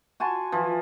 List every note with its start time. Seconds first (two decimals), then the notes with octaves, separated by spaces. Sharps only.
0.20 F#4 G#5 A5 C6
0.52 E3 F3